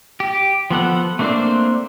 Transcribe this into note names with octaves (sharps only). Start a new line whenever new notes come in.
G4
F3 B3 A4 F#5
A3 A#3 C4 D4 C5